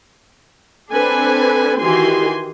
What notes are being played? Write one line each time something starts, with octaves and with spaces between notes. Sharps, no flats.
C4 D4 A4 B4 G#5
D#3 E3 F#4 G4 G#5 C6